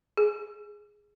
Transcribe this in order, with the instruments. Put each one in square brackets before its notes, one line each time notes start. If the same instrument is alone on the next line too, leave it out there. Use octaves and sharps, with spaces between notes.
[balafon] G#4